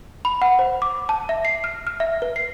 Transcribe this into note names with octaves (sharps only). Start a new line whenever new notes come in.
B5
F#5
C5
D6
A5
E5
C7
F6
F6
E5
B4
C7